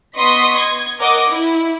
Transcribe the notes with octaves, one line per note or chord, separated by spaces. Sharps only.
B3 D#5 C6 C#6 D#6 B6
G#6
A#4 D#5 F#5 D6
E4